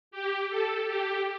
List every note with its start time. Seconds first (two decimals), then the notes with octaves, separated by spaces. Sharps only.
0.11 G4
0.49 A4
0.86 G4